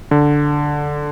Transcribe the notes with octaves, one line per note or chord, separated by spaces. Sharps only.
D3